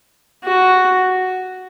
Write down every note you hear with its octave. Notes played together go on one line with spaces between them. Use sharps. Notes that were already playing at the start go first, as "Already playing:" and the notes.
F#4